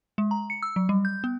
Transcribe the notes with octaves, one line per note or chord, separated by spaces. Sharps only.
G#3
A#5
C#7
E6
F#3
G3
G6
B3